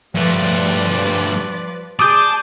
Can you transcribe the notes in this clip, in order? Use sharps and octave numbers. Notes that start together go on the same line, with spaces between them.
G2 F3 G3 A3 B4 D5
G#4 D5 A5 D6 D#6 G6